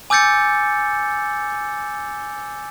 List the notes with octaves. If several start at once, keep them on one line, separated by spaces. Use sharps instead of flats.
G#5 D6 E6 G6 A6 C#7